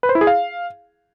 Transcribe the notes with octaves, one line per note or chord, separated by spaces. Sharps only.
B4
C5
E4
G#4
F5